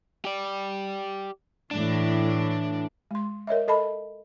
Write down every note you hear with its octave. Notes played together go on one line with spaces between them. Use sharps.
G4 D5
A2 E3 D4
G#3 C6
A#4 C#5 D#5 E5
A4 D#5 A5 B5